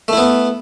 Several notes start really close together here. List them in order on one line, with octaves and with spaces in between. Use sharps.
A3 E4 B3